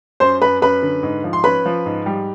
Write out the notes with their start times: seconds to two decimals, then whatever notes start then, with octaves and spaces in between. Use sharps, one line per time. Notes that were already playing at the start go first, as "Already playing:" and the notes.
0.20 F#2 C5 C6
0.42 F#2 B4 B5
0.61 F#2 B4 B5
0.83 D3
1.03 G#2
1.24 F3
1.33 C6
1.44 C#4 B4 B5
1.66 F3
1.86 G#2
2.06 G3